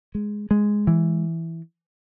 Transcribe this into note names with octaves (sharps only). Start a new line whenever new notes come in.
G#3
G#3
E3